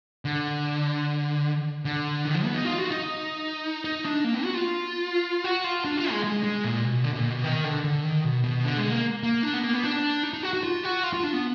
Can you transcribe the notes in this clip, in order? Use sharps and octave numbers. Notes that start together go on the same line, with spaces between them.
D3
D3
D#3
F3
B3
D#4
F4
F#4
D#4
D#4
D4
A#3
B3
F#4
F4
F#4
F4
D4
F4
G#3
G#3
G#3
A#2
B2
D3
B2
A#2
B2
D#3
D3
D3
D#3
B2
B2
D3
G#3
A#3
A#3
D4
B3
A#3
B3
D4
D#4
D#4
F#4
F#4
F4
F#4
F4
F4
D4
B3